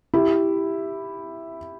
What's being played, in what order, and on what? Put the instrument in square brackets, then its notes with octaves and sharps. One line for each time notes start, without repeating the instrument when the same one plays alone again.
[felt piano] E4 G4